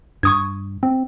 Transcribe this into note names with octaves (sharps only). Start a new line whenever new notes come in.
G2 C#6 D#6 G#6
C4